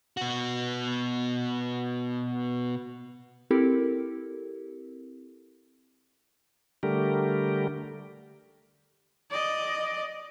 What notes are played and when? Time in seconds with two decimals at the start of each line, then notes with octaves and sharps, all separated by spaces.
0.17 B2 F#4
3.51 C4 E4 G4 A4 A#4
6.83 D3 G3 A3 G4 A#4
9.31 D5 D#5